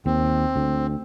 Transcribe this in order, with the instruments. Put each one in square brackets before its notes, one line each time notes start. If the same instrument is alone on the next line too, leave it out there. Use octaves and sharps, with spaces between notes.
[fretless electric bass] D#2 [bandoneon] C4
[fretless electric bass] D2